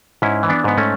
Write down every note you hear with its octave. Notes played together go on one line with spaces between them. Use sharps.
G#2 C#4 E4
E3
B3 D4
G#2 B3
A3 C#4